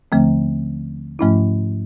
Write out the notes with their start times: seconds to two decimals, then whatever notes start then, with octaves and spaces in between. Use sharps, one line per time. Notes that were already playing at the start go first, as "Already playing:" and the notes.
0.12 D#2 D3 F3 A3 C4
1.19 G#2 F3 A3 C#4 E4